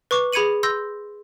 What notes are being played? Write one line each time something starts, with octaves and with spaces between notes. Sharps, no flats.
B4 C#6 D6
G#4 B5 G#6 C#7 D#7 F#7
C6 E6 G6 A#6